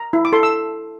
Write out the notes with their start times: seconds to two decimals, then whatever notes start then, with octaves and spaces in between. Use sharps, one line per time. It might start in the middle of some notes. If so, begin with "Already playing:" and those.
Already playing: A#5
0.13 E4
0.25 D6
0.33 A4 C6
0.43 E6